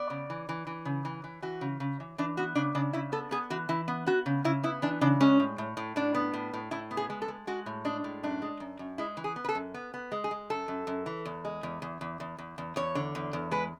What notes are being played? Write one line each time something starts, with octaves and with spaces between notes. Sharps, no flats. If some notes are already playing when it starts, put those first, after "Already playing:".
Already playing: B3 D5
C#3
E3
E3
E3
C#3
E3
E3
E3 F#4
C#3
C#3
E3
E3 D4
B3 F#4
C#3 D4
C#3 D4
C#3 E4
B3 A4
B3 G#4
E3 F#4
E3 E4
B3
B3 F#4
C#3
C#3 E4
B3 E4
E3 D4
C#3 D4
G#3 C#4
A2
A2
A2
A2 D4
B3
A2
A2
A2 E4
B3
G#4
G#3
A4
G#3
G#3 F#4
A2
G#3 D4
A2
F#2 D4
G#3
F#2
F#2
G#3 E4
E3
G#4
B3
B4
A4
F#2
B3
B3
G#3
G#4
G#3
F#2 A4
F#2
F#2
E3
E2
G#3
E2
E2
E2
E2
E2
E2
E2 C#5
D3
E2
E2
G#3 B4